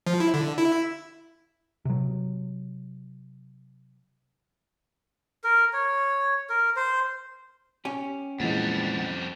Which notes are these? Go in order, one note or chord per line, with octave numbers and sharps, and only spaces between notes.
F3
E4
D3
E4
C3 F#3
A#4
C#5
A#4
C5
C#4 G4
F2 A#2 E3 G3 G#3 B3 A6